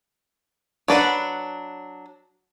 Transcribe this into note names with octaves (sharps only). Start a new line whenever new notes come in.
F#3 D4 B4 F#5